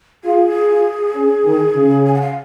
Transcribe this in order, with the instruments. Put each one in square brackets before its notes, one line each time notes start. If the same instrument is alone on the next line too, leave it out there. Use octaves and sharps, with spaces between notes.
[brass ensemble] F4 [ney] G#4
[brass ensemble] F4
C#4
D#3
C#3
[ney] G#5
F#5
F5